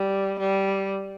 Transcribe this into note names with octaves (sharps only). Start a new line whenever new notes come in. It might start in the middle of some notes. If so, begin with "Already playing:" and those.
Already playing: G3
G3